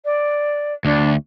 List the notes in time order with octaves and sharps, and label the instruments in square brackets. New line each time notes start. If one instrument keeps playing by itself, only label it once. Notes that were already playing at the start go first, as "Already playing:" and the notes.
[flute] D5
[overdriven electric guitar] D2 [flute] D4